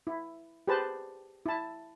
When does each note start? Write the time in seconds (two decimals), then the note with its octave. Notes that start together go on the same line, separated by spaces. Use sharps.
0.07 E4
0.68 G4 G#4 B4 C5 A5
1.46 E4 A5